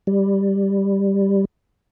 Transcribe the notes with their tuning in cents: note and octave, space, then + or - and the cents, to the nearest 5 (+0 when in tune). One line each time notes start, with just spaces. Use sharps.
G3 +5